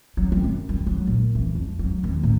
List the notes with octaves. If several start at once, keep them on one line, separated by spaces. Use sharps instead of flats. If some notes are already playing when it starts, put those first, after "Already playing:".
F#3
C4
F#2
G3
F#3
A#2
E3
F2
F#3
D#2
A2